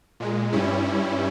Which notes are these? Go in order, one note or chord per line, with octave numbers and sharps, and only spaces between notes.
A#2 G#3
G2 G3 C#4 E4